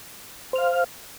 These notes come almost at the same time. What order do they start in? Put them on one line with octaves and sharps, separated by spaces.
C5 F6 F5